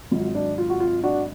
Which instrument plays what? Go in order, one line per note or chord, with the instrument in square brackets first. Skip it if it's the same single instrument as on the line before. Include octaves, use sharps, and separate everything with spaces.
[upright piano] G#1 G#2 F#3 F4
D4
F4
F#4
F4
D4 F#4